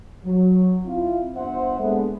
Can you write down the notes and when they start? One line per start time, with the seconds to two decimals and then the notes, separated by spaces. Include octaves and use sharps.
0.24 F#3
0.85 C4 E4 F4
1.35 G1 C5 E5 F#5
1.79 G#3 A#3 B3 D4 G#4 A4